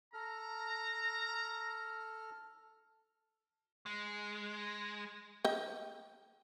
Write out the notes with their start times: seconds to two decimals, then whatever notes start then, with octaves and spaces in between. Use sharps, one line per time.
0.14 A4 A#5 F6
3.86 G#3
5.45 D#5 G5